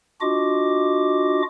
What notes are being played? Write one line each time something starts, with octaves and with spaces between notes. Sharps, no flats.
D4 F4 F#4 D#5 D6